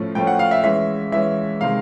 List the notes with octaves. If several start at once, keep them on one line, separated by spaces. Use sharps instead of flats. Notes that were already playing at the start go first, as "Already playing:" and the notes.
Already playing: A2 F3 A3 C#4
A2 F3 A3 C#4 G5
F#5
F5
E5
E3 G#3 C#4 E5
E3 G#3 C#4 E5
C3 D#3 G#3 F5